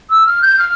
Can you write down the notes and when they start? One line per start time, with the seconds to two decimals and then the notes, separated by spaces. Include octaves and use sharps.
0.10 E6
0.27 F6
0.42 G6
0.59 F6